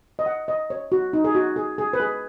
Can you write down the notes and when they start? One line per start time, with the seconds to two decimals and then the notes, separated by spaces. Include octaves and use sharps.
0.19 D#5
0.26 F#5
0.48 D#5
0.70 C#5
0.92 F#4
1.13 D#4
1.25 G#4
1.35 F#4
1.56 G#4
1.78 G#4
1.93 B4
2.00 G#4